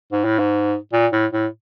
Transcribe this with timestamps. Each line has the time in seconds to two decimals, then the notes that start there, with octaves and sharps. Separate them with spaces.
0.12 G#2
0.25 A2
0.39 G#2
0.93 A#2
1.12 A2
1.33 A2